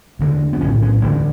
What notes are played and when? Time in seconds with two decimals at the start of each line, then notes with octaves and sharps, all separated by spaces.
0.19 E1 D2 D3
0.53 B3
0.61 B1 A2 C#4
0.82 C#4
1.03 E1 D2 D3 A3